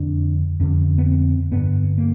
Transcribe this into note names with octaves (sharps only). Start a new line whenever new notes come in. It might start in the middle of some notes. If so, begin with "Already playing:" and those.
Already playing: F2 D3 D4
F2 D3 C#4
B3
C4
G2 D3 B3
A#3